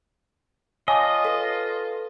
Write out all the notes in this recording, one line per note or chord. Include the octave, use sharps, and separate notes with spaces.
F4 C#5 D#5 G#5 A5 D6
A4 B4